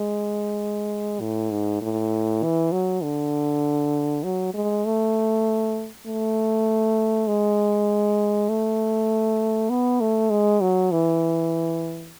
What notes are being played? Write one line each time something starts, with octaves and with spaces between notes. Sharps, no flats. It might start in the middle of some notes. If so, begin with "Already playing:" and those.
Already playing: G#3
A2
G#2
A2
E3
F#3
D3
F#3
G#3
A3
A3
G#3
A3
B3
A3
G#3
F#3
E3